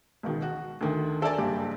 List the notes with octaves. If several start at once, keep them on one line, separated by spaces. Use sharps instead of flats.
C#2 B2 D#3
F#4
D2 D3 D#3
A4 A#4 D5 G#5 A5
F#1 G2 G4